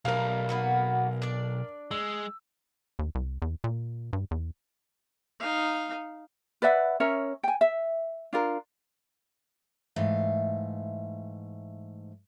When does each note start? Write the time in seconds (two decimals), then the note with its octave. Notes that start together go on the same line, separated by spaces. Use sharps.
0.05 B1 G3 A3 A#4 F5
0.49 A#3 B3 F#4
1.22 D4 D5
1.91 G#3 E6
2.99 D#2
3.15 C2
3.42 E2
3.64 A#2
4.13 G2
4.31 E2
5.40 D#4 F5
6.62 B4 D5 E5 F#5
7.00 C#4 A#4 C#5 E5
7.43 G5 G#5
7.61 E5
8.33 D4 F4 A#4
9.96 G#2 E3 A3 F5